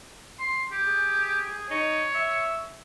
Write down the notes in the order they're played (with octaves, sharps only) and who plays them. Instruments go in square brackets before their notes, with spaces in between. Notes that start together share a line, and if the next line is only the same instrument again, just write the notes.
[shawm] C6
G4
[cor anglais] G#4
[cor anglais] D#4 [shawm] C#5
[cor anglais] E5